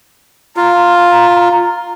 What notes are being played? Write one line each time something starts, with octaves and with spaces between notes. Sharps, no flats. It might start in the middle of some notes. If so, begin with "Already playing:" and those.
F4 A#5